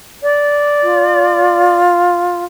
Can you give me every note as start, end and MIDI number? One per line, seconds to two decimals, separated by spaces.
0.23 1.78 74
0.83 2.44 65